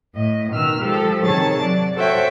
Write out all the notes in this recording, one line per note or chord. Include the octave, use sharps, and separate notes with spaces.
A2 D#5
B2 D#3 E6 F6
F3 G#3 G4 A4
C3 D#3 G#4 C#5 A5 A6
F#3 D5
F#4 A4 C5 C#5 E5 G5